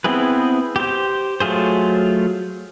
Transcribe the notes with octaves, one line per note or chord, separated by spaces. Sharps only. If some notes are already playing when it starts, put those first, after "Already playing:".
B3 C4 E4 G#4 B4
G4 C5
F#3 A3 F4 G#4 C5